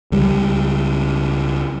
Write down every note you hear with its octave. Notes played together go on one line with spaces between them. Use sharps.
C#2 G3